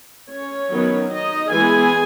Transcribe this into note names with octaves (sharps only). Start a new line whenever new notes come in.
C#4 C#5
D#3 F#3 B3
D#4 D#5
E3 G#3 B3 G#4 G#5